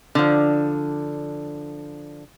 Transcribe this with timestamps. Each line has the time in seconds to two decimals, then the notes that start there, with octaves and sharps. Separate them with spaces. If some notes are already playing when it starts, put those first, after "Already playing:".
0.15 D3 F3